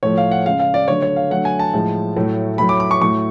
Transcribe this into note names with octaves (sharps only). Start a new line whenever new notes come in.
A2 F3 A3 C#5
F5
F#5
C#3 G#3 F5
F5
D5
D3 F#3 A3 C#5
C#5
F5
D3 F#3 A3 F#5
G#5
A5
A2 F3 G#3
A2 F#3 A3
A2 F#3 A3 B5
D6
D6
C#6
A2 F#3 A3 C#6